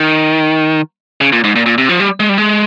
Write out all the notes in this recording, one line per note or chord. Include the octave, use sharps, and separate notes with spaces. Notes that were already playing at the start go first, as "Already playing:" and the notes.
Already playing: D#3
C#3
A#2
G#2
A#2
A#2
C3
F3
G3
G#3
G3
G#3